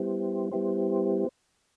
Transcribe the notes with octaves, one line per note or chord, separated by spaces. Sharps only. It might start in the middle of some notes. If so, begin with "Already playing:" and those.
Already playing: G3 B3 E4 G4 C5
G3 B3 E4 G4 C5